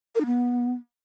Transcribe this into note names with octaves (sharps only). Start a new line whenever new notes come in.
A#4
D#4
B3